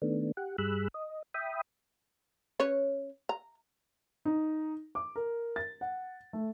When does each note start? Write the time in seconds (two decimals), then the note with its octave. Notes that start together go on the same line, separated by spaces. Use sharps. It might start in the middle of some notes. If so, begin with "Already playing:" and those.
0.02 D#3 A3 B3 D4
0.37 G4 F#5
0.58 G2 G3 G#4 B5 E6 F#6
0.94 D#5
1.34 E5 G5 B5 D#6
2.60 C#4 B4 C#5
3.29 A#5
4.25 D#4
4.95 D6
5.16 A#4
5.56 A6
5.81 F#5
6.33 A3